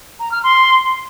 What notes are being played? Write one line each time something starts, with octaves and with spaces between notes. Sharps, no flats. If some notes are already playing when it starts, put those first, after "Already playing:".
A#5
F6
C6